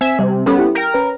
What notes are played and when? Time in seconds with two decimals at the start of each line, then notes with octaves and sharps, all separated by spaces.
0.01 C4 E5 G#5 G#6
0.19 C3 G3
0.46 G3 B3 C#4 A4
0.58 E4 G4
0.75 A#4 G5 A#5
0.94 C#4 B4